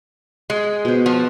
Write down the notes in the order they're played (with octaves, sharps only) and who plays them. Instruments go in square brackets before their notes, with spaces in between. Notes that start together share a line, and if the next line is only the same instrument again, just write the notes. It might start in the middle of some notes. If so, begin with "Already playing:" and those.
[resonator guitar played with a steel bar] G#3
[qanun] B2 C5
[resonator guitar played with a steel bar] F3 [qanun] F#5